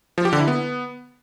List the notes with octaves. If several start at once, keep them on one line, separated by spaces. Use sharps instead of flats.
F3
G4
D3
E4
B3